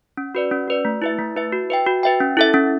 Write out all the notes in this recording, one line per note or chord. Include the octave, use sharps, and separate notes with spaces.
C#4
F#4 B4 D5
C#4
F#4 B4 D5
A3
E4 B4 E5
A3
E4 B4 E5
F#4
B4 E5 G5
F#4
B4 E5 G5
C#4
E4 A4 E5
C#4